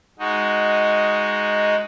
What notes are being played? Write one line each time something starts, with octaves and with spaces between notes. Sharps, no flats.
G#3 D#4 F#4